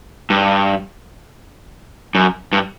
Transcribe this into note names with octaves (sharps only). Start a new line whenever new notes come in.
G2
F#2
G2